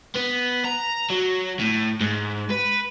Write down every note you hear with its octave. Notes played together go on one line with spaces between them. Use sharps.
B3
A#5
F#3
A2
G#2
B4